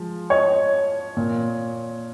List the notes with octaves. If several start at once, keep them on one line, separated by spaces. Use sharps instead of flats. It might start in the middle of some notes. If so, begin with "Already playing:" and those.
Already playing: F3 G#3
C#5 D#5
A#2